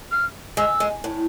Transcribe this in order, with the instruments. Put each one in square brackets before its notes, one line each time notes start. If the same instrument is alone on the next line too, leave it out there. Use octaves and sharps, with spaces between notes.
[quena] F6
[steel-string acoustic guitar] G#3 [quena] E6
[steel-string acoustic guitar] G#3
A2